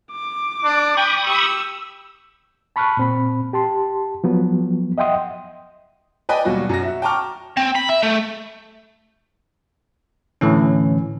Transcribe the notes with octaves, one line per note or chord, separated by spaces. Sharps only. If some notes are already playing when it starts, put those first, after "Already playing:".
D6
D4
G5 B5 C#6 D#6
G4 E6
A5 B5 C#6 F6 F#6
A#2 C4 B5
G4 A5 C6
F3 F#3 B3
D#5 E5 F#5 G5 C6 D#6
B4 D5 D#5 G5 G#5 B5
D#2 B2 F#3 G3 F#4
F#2 F#3 A#6
F#4 E5
G5 A5 A#5 C#6 D6 F6
C4
B5
E5
A3
A2 D3 E3 C#4